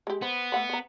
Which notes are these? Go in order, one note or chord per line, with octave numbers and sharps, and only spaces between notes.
G#3 G4
B3 C5
A3 F#5 B5
C5 A#5